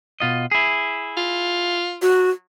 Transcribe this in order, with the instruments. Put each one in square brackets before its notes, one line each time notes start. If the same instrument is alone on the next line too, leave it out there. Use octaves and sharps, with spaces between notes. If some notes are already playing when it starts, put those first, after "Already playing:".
[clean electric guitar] B2 F4 D#5
E4 G#4
[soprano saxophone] F4
[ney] F#4